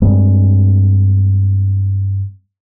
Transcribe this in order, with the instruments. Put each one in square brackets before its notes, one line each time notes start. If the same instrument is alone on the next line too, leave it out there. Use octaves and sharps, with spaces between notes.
[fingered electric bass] G2 G3 G#3 C4